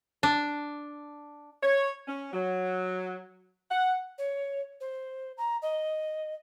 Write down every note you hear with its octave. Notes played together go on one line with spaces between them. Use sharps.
D4
C#5
C#4
F#3
F#5
C#5
C5
A#5
D#5